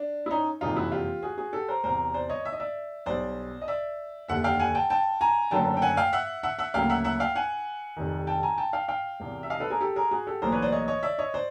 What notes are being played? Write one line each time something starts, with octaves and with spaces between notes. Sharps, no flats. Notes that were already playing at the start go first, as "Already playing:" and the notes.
Already playing: D4
E4
C#4 D#4
F#1 F2 C3 E3 G#3 D#4 F4
E4 F#4
F4 G4
F#4 G#4
F#4 G#4
G4 A4
A#4 C5
E1 E2 C3 A#4 C5
C5 D5
C#5 D#5
E5
D#5
D5 E5
B1 B2 G3 C5 D5
D#5
D5 E5
F1 D#2 D3 E5 F#5
F5 G5
F#5 G#5
G5 A5
G5 A5
G#5 A#5
F#1 F#2 D3 F#3 A3 G5 A5
G5
F#5 G#5
F5 G5
E5 F#5
E5 F#5
E5 F#5
D2 C#3 F#3 A#3 F5 G5
E5 F#5
E5 F#5
F5 G5
F#5 G#5
F1 F2 C3 D#3
G5 A5
G#5 A#5
G5 A5
F5 G5
F5 G5
E1 E2 C3
E5
D#5 F5
A4 B4
G#4 A#4
G4 A4
G#4 A#4
F#4 G#4
G4 A4
B1 A2 E3 G3 A#3 A#4 C5
B4 C#5
C5 D5
C#5 D#5
C#5 D#5
D5 E5
C#5 D#5
C5 D5